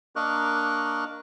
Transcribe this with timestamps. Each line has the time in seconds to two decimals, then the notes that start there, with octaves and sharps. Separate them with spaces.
0.16 A#3 D4 A#4 D#5 C#6 F#6